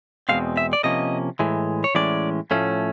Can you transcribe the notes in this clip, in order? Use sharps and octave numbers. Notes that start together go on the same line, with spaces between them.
E2 B2 G#3 C4 F5
E5
D5
C3 F3 A#3 C#4 D#5
A2 E3 G#3
C#5
A2 E3 G#3 C#4 D5
A2 F3 A3 C#4